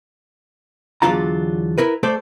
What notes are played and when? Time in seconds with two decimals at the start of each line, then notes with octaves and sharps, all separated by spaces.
1.02 E2 D3 F#3 D4 F4 A#5
1.78 E4 A#4 B4
2.03 A3 A4 C5 D5